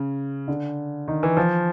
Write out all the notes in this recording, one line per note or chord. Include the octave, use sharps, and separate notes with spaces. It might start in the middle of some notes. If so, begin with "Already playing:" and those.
Already playing: C#3
D3
D#3
E3
F3